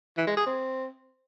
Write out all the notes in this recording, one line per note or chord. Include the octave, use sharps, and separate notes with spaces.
E3
G#3
G#4
C4